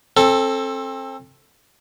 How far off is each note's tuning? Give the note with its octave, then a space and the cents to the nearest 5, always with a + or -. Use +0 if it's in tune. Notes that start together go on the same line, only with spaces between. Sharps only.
C4 +30 A4 +0